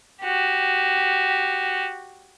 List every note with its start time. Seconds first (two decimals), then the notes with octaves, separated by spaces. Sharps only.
0.23 F#4 G4